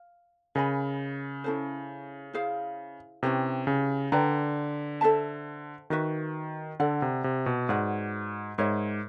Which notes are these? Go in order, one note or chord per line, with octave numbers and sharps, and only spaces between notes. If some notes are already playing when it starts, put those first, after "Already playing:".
Already playing: F5
C#3 A#4 D#5 G#5 B5
C#4 E4 A4 C5
E4 G#4 C5 F5
C3 C#4 E4 G4 B4
C#3
D3 B4 D5 G5 A#5
A4 C5 E5 A5
D#3 F#4 B4 E5
D3 A4 D5 F#5
C3
C3
B2
G#2 F#4 B4 D5 F#5
G#2 A#4 C#5 E5